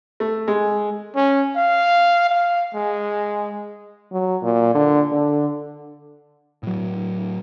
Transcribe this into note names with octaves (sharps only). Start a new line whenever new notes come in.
A3
G#3
C#4
F5
F5
G#3
F#3
A#2
D3
D3
A2 F#3